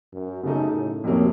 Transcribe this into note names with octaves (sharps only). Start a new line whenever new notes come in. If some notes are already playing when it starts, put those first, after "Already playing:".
F#2
F#2 C#3 A3 D#4
A2
F2 C3 F#3 A#3 C#4